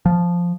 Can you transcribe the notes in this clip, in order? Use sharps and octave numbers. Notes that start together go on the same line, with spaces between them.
F3